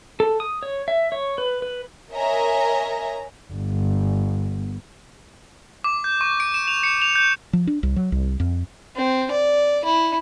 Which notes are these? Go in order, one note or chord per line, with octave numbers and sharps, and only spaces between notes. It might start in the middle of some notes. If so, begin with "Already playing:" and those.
A4
D#6
C#5
E5
C#5
B4
B4
A#4 C#5 D#5 E5 G#5 A#5
G1
D6
G6
C#6
D7
E7
F7
C#7
F7
G6
F3
D4
C2
F#3
C2
F2
C4
D5
E4